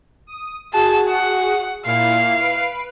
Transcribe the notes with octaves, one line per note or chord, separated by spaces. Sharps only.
D#6
F#4 G#4 A5
F#5
A#2 E4 F5
B4 C7 D7